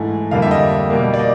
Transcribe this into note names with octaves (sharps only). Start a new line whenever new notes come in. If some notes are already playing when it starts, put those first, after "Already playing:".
Already playing: G#2 E3 A3 G#5
F2 D3 G3 A#3 F5
E5
D#5
B2 G3 A#3
D5
D#5